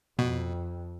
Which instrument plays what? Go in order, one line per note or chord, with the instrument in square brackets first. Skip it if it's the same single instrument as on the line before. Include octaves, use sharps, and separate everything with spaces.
[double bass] F2 [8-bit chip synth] B2